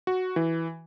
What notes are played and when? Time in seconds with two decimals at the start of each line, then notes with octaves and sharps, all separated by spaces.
0.07 F#4
0.36 E3